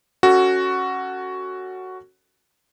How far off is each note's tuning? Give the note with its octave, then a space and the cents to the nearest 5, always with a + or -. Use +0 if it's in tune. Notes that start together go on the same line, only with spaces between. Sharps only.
C#4 -5 F#4 +5 A4 +25